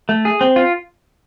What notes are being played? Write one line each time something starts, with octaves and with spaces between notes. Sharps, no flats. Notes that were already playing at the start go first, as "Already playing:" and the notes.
A3
G#4
C4
F4